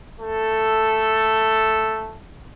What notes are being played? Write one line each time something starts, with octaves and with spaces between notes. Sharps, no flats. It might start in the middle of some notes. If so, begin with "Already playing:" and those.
A3 A4